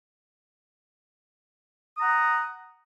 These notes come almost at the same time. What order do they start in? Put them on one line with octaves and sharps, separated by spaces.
D#6 A#5 F#5